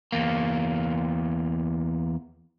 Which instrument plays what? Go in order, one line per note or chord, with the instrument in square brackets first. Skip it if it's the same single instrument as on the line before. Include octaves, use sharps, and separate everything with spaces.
[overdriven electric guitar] E2 A#3